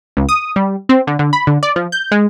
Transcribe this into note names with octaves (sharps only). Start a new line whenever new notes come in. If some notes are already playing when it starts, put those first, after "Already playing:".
C#2
D#6
G3
C4
D3
D3
B5
D3
D5
F3
G6
G#3